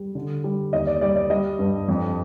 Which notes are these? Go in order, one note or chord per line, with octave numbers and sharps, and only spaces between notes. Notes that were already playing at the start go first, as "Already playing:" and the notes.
Already playing: G3
D3
G3
D#2 D#5
D5
G3 D5
D5
G3 D#5
G2
F2